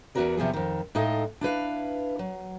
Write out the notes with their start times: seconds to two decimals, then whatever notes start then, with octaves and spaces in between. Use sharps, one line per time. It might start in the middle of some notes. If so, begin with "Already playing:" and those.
0.15 E2 C3 B3 F#4 A#4 D5
0.37 E2 C3 F3 B3 G#4
0.53 F2 D#3
0.95 A2 G#3 D#4 A4 D#5 F5
1.41 D4 E4 B4 F5
2.19 F#3